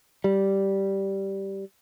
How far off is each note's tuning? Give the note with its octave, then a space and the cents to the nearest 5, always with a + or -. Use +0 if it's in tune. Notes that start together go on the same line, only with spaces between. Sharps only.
G3 -10